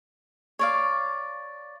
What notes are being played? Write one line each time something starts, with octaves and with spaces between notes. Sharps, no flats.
C#5 D5 F5